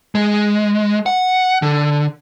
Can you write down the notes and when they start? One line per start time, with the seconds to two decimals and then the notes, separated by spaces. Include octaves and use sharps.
0.15 G#3
1.06 F#5
1.62 D3